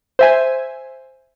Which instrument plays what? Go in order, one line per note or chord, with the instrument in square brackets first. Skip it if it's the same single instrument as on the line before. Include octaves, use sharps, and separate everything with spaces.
[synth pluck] C5 E5 G#5